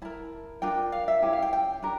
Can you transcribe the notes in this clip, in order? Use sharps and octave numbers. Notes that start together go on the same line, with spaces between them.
E4 A#4 A5
D4 F4 A#4 G5
F5
E5
C#4 E4 G4
F5
G5
G5
D4 G4 A#4